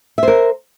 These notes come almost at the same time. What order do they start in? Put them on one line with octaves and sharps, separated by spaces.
E5 C5 A#4